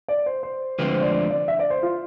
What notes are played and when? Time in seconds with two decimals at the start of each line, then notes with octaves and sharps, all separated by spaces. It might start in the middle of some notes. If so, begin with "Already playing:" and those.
0.08 D5
0.26 C5
0.43 C5
0.79 D2 D3 F3 G#3 C4 B4
0.90 C5
1.01 D5
1.12 D5
1.31 D5
1.48 E5
1.59 D5
1.70 C5
1.83 F4